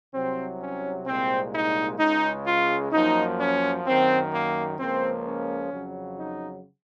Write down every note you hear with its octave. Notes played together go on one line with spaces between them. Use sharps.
C2 C3 F#3 C4
C#4
C2 A#2 G#3 C4
D#4
C#2 C#3 G#3 D#4
F4
F#2 F3 A#3 D#4
C#4
F#2 D#3 A#3 C4
A#3
C#2 C#3 F3 A#3 C4
C#4
F2 C#3 F#3
D#4